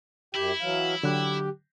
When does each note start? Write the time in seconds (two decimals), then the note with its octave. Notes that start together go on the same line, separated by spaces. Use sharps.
0.35 F#2 E4 G4 G5
0.61 E3 F#3 F5
1.03 D3 F#3 G4 F#6